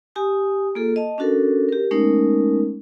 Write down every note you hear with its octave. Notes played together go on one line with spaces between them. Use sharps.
G4 G#5 D#6
A#3 F4 G#4 A4
D#5 A5
C#4 D4 F#4 A4 A#4
G4 A#4
G#3 A3 B3 C#4 D#4 A#4